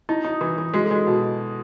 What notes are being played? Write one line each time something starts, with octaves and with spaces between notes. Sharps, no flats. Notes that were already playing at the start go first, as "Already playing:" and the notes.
D#4 E4
D#4
E3
E3
G#3 F#4
A4
G#3 F#4
B2